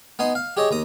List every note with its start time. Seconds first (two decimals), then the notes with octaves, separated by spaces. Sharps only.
0.19 B3 D#4 G#5 C6
0.35 F5
0.57 G4 G#4 C#5 D#5
0.71 D#2 A#5 D#6